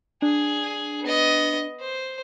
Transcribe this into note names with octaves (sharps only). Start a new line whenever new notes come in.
D4 G#4
B3 D#5
C5